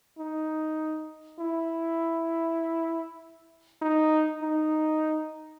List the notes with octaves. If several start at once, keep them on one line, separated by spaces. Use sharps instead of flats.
D#4
E4
D#4
D#4